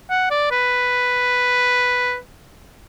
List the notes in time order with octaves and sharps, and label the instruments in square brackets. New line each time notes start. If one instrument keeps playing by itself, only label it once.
[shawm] F#5
D5
B4